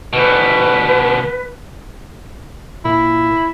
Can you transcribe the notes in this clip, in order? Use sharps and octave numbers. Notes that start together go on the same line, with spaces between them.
D2 B2 B4
A#2 E4